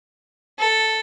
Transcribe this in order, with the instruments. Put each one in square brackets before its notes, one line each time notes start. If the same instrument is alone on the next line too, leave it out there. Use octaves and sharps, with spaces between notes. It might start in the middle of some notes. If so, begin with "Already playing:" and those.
[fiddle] A4